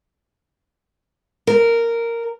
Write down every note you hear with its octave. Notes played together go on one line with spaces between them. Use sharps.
A#4